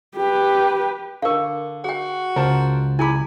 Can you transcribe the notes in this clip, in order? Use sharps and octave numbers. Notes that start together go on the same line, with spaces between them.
G4 B4
D3 A#4 F5 C#6
F#4 G#4 G5
C#2 A#4 C5 A5
E4 G#4 G#5 B5 D6